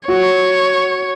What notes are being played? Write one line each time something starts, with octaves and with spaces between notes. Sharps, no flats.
F#4 C#5